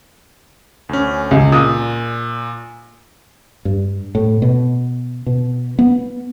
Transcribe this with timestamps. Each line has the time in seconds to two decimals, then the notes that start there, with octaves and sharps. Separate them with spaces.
0.89 D2 C#4
1.31 C#2
1.52 A#2 D#6
3.65 G2
4.15 A2
4.42 B2
5.26 B2
5.79 B3